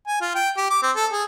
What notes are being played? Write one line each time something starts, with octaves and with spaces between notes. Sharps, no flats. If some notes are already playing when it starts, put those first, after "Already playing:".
G#5
F4
G5
G4
D6
C4
A4
G#4